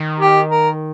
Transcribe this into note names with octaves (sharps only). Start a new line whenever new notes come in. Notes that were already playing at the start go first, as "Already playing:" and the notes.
Already playing: D#3
G4
A#4